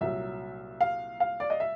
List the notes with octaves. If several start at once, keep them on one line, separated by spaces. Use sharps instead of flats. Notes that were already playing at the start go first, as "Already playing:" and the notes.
C2 A#2 F#3 E5
F5
F5
D5
D#5
E5